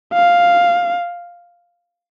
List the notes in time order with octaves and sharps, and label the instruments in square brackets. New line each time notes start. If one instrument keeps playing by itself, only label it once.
[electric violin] F5